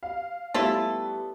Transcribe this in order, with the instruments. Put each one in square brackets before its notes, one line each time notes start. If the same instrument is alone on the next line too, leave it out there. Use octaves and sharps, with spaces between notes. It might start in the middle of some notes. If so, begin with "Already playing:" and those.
[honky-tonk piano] F5
[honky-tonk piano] G3 A3 B3 [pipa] E4 F4 A4